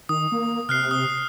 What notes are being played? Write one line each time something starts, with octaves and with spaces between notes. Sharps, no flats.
D#3 D#6
A#3
C3 F6 F#6 C7
D#6